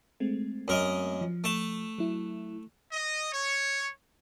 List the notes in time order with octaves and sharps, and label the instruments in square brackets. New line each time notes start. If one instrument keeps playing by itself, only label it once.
[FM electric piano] G#3 A3 C4
[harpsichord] F#2 A#4 D#5
[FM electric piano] F3
[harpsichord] A3 A5
[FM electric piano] F#3 E4
[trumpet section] D#5
C#5